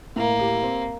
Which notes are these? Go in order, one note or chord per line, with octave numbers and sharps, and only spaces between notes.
A2 A#3
G4
C4